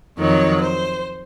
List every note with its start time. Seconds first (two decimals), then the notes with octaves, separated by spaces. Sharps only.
0.18 F2 D#3 F#3 C#5
0.61 C5